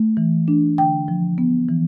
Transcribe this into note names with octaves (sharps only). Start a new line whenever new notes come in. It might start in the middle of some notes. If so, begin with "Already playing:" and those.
Already playing: A3
E3
D4
D3 G5
F3
B3
E3